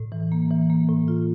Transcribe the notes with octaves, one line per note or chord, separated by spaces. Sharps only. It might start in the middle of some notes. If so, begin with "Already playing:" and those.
Already playing: A2
E3
A#3
E3
A#3
A2
F4